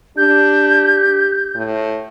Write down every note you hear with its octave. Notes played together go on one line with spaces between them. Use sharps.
D4 G4 G6
A2